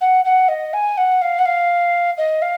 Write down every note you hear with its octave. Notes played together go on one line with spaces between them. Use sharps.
F#5
F#5
D#5
G#5
F#5
F5
F#5
F5
D#5
F5